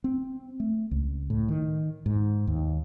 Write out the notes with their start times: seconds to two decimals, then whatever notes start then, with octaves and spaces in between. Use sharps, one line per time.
0.04 C4
0.60 A3
0.91 C#2
1.30 A2
1.49 D#3
2.06 G#2
2.47 D#2